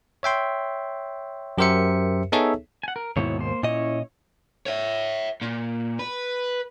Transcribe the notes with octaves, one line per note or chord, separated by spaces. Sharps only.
C#5 E5 G5 C6
F#2 G4 A#4 C5 E5 C#7
B3 D#4 G#4 A4 C#5 E5
F#5 G#5
A#4
D#2 G#2 B2 E4 C#5
A#3 C5
A#2 C#4 E4 C#5 D#5
C#5 E5
A#2
B4